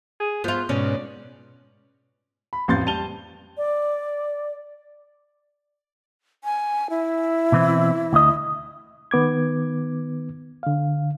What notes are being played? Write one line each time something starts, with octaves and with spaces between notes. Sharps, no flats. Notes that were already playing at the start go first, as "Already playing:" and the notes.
G#4
F3 B3 F4
G#2 B2 C#4 D5
B5
A1 F2 C6 G6 A6
G3 A5 D#7 F7 G7
D5
G#5
E4
B2 E3 C4
D2 D#5
D#3 B3 D6 G#6
D3 F5